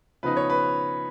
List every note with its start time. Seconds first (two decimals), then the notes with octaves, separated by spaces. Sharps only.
0.23 C#3 F3 B3 D#4 B4
0.37 C#5
0.50 B4